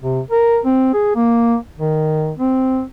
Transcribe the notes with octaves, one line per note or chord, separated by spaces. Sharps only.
C3
A#4
C4
G#4
A#3
D#3
C4